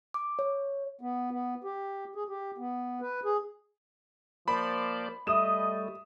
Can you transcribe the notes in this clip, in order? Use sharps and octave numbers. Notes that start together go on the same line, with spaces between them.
D6
C#5
B3
B3
G4
G#4
G4
B3
B4
G#4
F3 A#3 C5 D5 B5
G3 A3 D#5 E5 D#6 E7